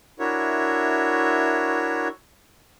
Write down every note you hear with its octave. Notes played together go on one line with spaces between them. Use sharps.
D4 E4 F#4 A#4 C#5 E5